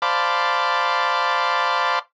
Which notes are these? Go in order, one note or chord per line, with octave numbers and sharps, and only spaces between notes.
C5 D5 F5 A5 B5 D6